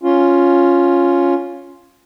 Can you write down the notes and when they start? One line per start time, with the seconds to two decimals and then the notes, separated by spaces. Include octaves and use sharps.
0.03 C#4 F4